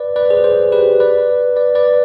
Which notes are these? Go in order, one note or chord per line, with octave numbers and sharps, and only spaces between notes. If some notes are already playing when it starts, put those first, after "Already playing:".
Already playing: B4 D5
B4 D5
G#4 C5
G#4 C5
G4 B4
B4 D5
B4 D5
B4 D5